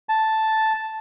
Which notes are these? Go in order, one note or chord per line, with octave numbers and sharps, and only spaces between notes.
A5